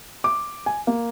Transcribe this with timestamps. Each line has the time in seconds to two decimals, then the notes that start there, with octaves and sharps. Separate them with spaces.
0.24 D6
0.66 G#5
0.87 A#3